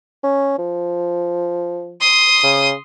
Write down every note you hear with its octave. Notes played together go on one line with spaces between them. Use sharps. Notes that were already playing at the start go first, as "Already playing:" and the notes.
C#4
F3
C6 D#6
C#3